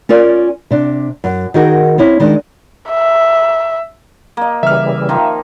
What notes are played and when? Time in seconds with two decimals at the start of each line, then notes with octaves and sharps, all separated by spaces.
0.09 C#4 F4 A#4 D5
0.71 C3 D4
1.24 F#2
1.54 D#3 D#4 F#4 G#4 A#4
1.98 C4 C#4 E4
2.20 D#3 G#3 D4
2.90 E5
4.37 A#3 D#5
4.63 C#3 E3 G3 E5 F6
5.09 D#3 F3 A#3